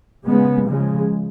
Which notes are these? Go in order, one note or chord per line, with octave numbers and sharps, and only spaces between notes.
C#3 G#3 B3
C#3 F3 G#3